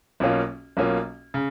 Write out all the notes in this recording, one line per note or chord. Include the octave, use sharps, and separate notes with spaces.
B1 B2 A#3 C#4 F4
B1 B2 A#3 C#4 F4
C#3